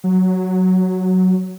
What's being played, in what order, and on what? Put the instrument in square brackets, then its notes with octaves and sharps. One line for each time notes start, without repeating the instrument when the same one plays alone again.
[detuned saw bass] F#3